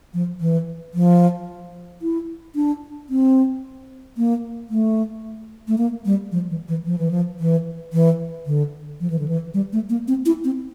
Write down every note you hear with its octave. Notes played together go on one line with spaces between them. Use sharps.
F3
E3
F3
E4
D4
C4
A#3
A3
A3
A#3
G3
F3
E3
E3
F3
E3
F3
E3
E3
D3
F3
E3
D3
E3
G3
A3
A#3
C4
E4
C4